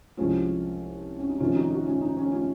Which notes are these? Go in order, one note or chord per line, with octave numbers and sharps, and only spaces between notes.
C2 C3 F3 G#3 C#4 F4
C#4
D#4
F2 C3 D#3 C#4 F4
D#4 F#4
D#4 F#4
C#4 F4
D#4
C#4
C#4 F4